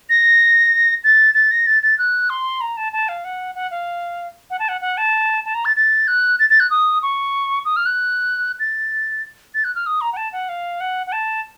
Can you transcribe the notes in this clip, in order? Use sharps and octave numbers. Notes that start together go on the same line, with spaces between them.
A#6
A6
A6
A#6
A6
A6
F#6
C6
A#5
A5
A5
F5
F#5
F#5
F5
F#5
A5
F#5
F#5
A5
A5
A#5
A6
A6
F#6
A6
A6
F#6
D#6
C#6
D#6
F6
F#6
A6
A6
F#6
F6
D#6
A#5
F#5
A5
F#5
F5
F#5
F#5
A5